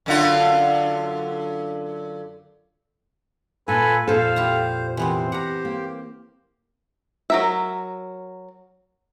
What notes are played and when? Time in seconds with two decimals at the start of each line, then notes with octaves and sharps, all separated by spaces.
0.06 F#2 D3 F4
3.68 A#2 F4 A4 B4 G#5
4.08 F2 A#2 A4 C5 F5
4.36 E4 F4 G4
4.97 C3 E3 B3 C4 C5
5.32 G4 F#5 A#5
5.65 A#3
7.30 F#3 A#4 E5